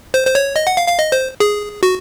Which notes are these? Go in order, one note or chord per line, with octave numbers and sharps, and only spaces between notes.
C5
C5
C#5
D#5
F#5
F5
F5
D#5
C5
G#4
F#4